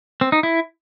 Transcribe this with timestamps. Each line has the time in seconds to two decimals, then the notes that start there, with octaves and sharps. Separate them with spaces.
0.21 C4
0.32 D#4
0.43 E4